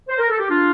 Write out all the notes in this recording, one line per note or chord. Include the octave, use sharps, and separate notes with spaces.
C5
A#4
A4
G4
D4 F4